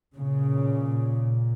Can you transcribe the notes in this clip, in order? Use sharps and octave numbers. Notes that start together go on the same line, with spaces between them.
A#2 C#3